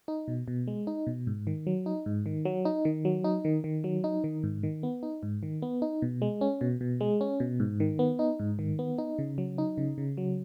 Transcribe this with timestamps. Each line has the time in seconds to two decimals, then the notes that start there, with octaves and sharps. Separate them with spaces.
0.08 D#4
0.28 B2
0.48 B2
0.67 G#3
0.87 D#4
1.07 B2
1.27 G#2
1.47 D#3
1.67 F#3
1.86 D#4
2.06 G#2
2.26 D#3
2.45 F#3
2.65 D#4
2.85 D#3
3.05 F#3
3.24 D#4
3.45 D#3
3.64 D#3
3.84 F#3
4.04 D#4
4.24 D#3
4.44 G#2
4.63 D#3
4.83 B3
5.03 D#4
5.23 G#2
5.43 D#3
5.62 B3
5.82 D#4
6.02 B2
6.22 G#3
6.41 C#4
6.61 B2
6.81 B2
7.01 G#3
7.21 C#4
7.40 B2
7.60 G#2
7.80 D#3
7.99 B3
8.19 D#4
8.39 G#2
8.59 D#3
8.79 B3
8.98 D#4
9.19 C#3
9.38 F#3
9.58 D#4
9.78 C#3
9.98 C#3
10.17 F#3